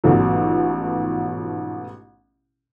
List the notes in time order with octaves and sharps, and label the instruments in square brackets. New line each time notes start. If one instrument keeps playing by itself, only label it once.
[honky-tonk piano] A1 G#2 B2 F3 F#3